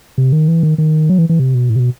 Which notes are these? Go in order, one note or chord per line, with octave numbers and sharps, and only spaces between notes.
C3
D#3
E3
D#3
D#3
F#3
E3
E3
C3
B2
A2
C3
B2